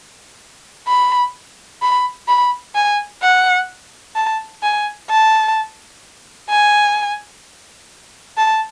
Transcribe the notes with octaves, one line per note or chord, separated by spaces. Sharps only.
B5
B5
B5
G#5
F#5
A5
G#5
A5
G#5
A5